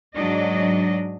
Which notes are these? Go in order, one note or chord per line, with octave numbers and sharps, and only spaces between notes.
G#2 F#3 D4 D#5